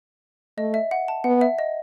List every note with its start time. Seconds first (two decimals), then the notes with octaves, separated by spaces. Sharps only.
0.57 A3 D#5
0.74 E5
0.91 F#5
1.08 A5
1.24 B3 F#5
1.41 E5
1.59 D#5